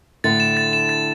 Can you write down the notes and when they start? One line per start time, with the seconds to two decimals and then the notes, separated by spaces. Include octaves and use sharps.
0.24 A2 D3 A6
0.40 E7
0.57 A6
0.73 E7
0.89 A6